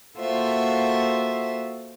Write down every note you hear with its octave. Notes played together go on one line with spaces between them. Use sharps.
A#3 F4 F#4 A4 C5 E5